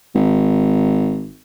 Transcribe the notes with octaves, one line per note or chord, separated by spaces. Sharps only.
G#1